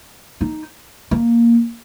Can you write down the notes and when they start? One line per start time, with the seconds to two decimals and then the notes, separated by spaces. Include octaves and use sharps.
0.41 D#4
1.11 A#3